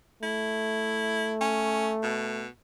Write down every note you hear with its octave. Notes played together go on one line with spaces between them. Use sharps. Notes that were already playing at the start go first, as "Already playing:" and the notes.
A3 E4
C#4
B2